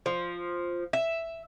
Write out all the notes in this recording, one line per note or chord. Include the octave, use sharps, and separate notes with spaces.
F3
E5